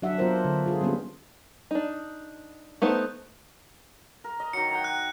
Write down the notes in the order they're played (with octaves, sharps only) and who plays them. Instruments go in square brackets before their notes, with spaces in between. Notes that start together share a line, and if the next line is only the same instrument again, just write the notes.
[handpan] F#3 D4 E5 F#5
F#3 B3 D4 F4 A#4 C5
D3
F4 G#4
G3 A#3 B3 C#4 G#4
[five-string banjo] D4 D#4
A3 B3 D#4 C5
[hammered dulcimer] A#4
D#5
[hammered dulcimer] D#3 F#3 [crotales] C#7
[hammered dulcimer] F#5 G5 A#5
[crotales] F#6